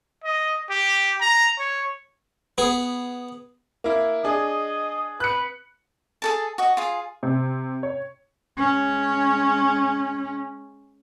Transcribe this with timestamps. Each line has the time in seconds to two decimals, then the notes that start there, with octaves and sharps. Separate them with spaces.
0.24 D#5
0.70 G4
1.21 A#5
1.59 C#5
2.58 B3 G#4
3.84 A#3 E4
4.24 D4 G#4 D#5
5.20 B4 F#6 C#7
6.22 G#4 A4 A5
6.58 F#4 D#5
6.77 F4 G#4
7.23 C3
7.83 C#5
8.58 G#3 C#4